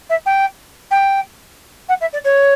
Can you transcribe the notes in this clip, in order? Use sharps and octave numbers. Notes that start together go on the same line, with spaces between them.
E5
G5
G5
F#5
E5
D5
C#5